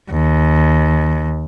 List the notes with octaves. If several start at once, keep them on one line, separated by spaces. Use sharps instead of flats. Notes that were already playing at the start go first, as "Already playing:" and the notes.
D#2